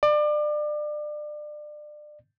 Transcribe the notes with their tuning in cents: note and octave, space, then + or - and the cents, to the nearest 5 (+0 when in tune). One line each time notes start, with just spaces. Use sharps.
D5 +30